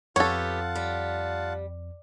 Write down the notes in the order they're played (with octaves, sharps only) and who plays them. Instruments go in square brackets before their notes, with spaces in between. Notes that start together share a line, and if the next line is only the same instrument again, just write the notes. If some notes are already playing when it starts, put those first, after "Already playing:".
[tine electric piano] F2 [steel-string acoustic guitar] B3 G4 [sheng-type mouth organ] F4 F#5 A5 [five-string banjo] A4 C#5
[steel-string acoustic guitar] G3